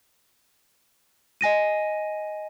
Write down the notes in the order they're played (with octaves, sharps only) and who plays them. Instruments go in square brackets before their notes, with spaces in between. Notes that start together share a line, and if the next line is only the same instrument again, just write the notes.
[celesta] D#5 G#5 A#6 D#7